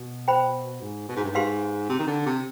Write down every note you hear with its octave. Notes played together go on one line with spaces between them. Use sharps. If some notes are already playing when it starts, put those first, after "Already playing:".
Already playing: B2
C5 G5 B5
G#2
B2
G#2
G2
G#2 G4 B4 F5 C6
C3
D#3
D3
C3